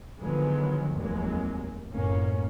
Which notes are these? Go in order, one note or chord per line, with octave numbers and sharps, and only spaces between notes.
D3 D#3 F3 F#3 G#3 B3
F1 D#2 C3 F#3 G#3 A#3
F#1 C#2 A2 A#3 C#4